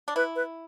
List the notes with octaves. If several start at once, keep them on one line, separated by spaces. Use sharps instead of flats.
D4
E4 B4
B4